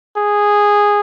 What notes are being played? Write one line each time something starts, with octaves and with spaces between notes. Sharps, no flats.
G#4